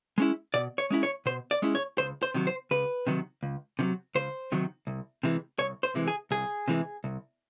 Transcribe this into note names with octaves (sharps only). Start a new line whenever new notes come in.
G#3 C#4 E4
B2 D5
C#5
G#3 C#4 E4
C#5
B2 C5
D5
G#3 C#4 E4
C#5
C#2 C5
C5
C3 D#3 F#3
C5
C#2 B4
C3 D#3 F#3
C#2
C3 D#3 F#3
C#2 C5
C3 D#3 F#3
C2
C3 E3 G#3
C2 C#5
C5
C3 E3 G#3
G#4
C2 G#4
C3 E3 G#3
C2